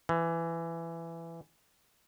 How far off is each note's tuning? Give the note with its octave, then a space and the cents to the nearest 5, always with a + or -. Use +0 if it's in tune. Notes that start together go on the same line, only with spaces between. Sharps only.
E3 +15